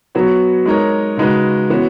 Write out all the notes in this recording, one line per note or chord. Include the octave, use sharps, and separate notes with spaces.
F#3 B3 F#4 C#5
G#3 D#4 A#4 C#5
C#3 G#3 D#4 F#4 B4
E3 B3 F#4 C#5